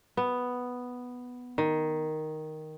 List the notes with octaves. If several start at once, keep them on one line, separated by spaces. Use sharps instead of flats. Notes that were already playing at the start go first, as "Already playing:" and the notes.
B3
D#3